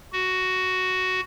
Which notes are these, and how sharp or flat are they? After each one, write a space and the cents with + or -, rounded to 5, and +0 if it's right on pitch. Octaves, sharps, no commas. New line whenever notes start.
F#4 +5